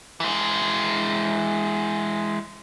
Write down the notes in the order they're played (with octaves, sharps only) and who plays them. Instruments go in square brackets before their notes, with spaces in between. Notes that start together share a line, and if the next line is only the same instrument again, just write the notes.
[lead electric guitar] E3 G#3